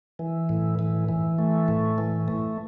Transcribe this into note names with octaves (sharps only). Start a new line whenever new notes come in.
E3
A2
E3
E3
A3
A2
E3
A3